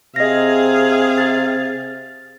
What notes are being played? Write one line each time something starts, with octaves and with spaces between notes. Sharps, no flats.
C3 G#4 D#5 F5 A#6
A6